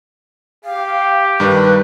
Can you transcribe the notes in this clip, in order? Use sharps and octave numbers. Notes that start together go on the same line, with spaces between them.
G4 F5
G2 D#3 G3 B4